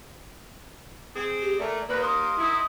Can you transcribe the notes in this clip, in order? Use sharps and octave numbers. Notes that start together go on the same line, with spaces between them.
C4 G#4
G4
A#2 A3 D5
D#2 A#3 B4 D5
C6 D#6
D#3 D#4 E4